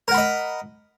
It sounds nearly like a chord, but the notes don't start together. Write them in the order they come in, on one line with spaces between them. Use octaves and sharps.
A#4 F#5 B5 D#5